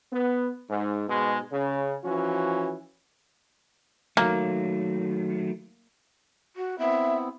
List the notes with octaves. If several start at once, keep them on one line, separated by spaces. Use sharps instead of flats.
B3
G#2
G#2 B2 G#3
C#3
E3 F3 C#4 F#4
D#3 F#3 A3 A#3
F#4
B3 C4 E4 E5